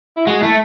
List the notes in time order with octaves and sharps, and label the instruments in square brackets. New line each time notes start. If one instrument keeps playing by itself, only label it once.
[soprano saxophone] E4
[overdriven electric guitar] G#3 [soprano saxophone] F#4
[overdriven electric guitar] A3 [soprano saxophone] E4